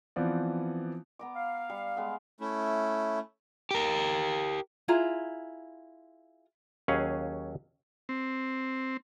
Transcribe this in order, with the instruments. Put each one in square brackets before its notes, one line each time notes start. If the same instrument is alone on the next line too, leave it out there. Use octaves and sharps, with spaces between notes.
[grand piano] E3 F3 B3 C4 F4 D5
[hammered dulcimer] B3 A#5 D6
[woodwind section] F5
[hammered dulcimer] G3
G#3 B3
[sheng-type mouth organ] A3 C#4 E4
[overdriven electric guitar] G4 A#4
[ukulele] E4 F4 G#4 A#5
[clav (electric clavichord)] D#2 F#3 C#4 G#4 F5 F#5
[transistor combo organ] C4